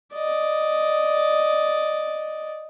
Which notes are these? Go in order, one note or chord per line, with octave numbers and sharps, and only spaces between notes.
D5 D#5